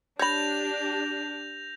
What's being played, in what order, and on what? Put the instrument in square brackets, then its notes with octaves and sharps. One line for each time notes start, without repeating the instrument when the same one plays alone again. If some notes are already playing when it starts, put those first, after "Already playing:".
[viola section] D4 G4 [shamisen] C#5 B5 [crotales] G6 A#6 F7